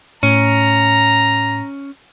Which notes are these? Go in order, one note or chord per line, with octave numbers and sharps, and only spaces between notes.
A2 C#4 A#5